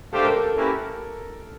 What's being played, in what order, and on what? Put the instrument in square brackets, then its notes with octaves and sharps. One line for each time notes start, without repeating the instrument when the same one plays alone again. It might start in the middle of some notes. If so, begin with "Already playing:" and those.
[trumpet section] A3 D4 G4 C5 F5 [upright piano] A4
[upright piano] A#4
A4
[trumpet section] A#3 C#4 E4 G4 B4